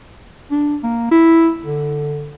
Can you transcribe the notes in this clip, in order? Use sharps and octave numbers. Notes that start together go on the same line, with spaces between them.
D4
A#3
E4
D3